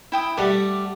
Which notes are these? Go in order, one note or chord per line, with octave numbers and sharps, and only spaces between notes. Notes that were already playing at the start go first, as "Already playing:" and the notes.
E4 G5 D#6
G3 A3 D5 F#5